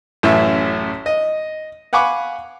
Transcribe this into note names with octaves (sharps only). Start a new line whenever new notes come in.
A1 F#2 E3 A3 C#5 E5
D#5
F5 F#5 G#5 B5 C#6 D6